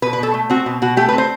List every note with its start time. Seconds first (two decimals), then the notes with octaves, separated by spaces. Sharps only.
0.02 B2 B4
0.13 B4
0.19 B2 A4
0.34 A3
0.50 C4 F#4
0.66 B2
0.82 B2 F#4
0.97 A3 G4
1.09 B4
1.13 C4
1.18 C5